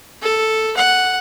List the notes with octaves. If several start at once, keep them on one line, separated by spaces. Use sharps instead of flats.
A4
F#5